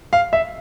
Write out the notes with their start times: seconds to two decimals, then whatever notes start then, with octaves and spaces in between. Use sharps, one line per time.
0.13 F5
0.33 E5